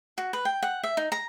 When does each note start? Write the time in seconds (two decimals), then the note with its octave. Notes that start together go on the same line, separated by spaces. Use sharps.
0.18 F#4
0.33 B4
0.45 G5
0.63 F#5
0.83 E5
0.97 D#4
1.12 A#5